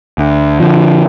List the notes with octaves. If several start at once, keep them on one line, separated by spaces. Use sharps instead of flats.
D2
D3 F3